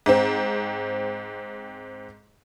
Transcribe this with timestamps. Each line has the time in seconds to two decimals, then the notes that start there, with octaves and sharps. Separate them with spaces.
0.06 G#2 C4